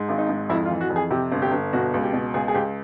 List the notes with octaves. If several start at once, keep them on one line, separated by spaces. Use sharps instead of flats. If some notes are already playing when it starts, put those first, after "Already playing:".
Already playing: G#2
G#1
D#4
G#2
F2 E4
F4
E3
F#4
F2
G#4
C3 G4
G1
G4
G1
B2 F#4
C#2
G4
B2
C#2 G#4
G#4
C#2 G4